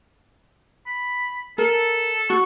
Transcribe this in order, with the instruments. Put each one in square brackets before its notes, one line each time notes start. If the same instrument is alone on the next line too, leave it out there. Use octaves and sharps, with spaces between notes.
[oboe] B5
[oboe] A4 [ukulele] A#4
[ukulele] F#4 [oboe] C#6